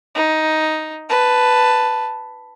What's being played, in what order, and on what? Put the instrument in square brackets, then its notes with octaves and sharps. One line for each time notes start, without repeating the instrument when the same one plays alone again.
[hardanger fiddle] D#4
B4 A5